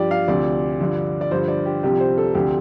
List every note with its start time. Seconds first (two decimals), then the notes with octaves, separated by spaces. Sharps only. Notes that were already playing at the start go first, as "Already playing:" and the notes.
Already playing: G2 F3 G4 D5
0.11 F5
0.28 D2 C3 F3 D5
0.79 G2 D3 F3
1.21 D5
1.31 G2 D3 F3 C5
1.48 D5
1.66 G4
1.83 C2 C3 F3 G4
2.00 C5
2.18 A4
2.34 D2 C3 F3 G4